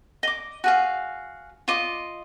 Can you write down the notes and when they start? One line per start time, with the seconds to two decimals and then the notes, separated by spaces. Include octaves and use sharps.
0.23 D#5 D6
0.64 F#4 G#4 F5
1.68 F4 D#5 D6